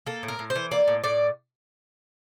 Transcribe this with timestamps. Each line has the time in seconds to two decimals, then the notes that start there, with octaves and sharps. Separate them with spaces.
0.06 A#3 A4
0.23 A2
0.28 A#4
0.39 A2
0.50 C5
0.55 E3
0.71 A#3 D5
0.88 A2
1.04 A2 D5